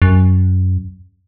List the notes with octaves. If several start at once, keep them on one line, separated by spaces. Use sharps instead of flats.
F#2